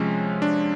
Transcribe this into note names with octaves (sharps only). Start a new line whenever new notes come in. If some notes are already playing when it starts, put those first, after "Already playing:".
Already playing: C3 F3 G#3 C#4
D4